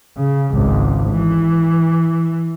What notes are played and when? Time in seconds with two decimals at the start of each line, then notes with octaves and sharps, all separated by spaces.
0.18 C#3
0.52 G#1 C#2
1.11 E3